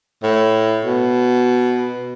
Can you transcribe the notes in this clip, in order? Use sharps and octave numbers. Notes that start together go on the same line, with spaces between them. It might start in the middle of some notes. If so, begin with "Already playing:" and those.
A2
B2